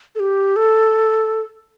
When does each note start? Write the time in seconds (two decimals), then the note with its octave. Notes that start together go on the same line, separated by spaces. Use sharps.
0.15 A4
0.20 G4
0.56 A4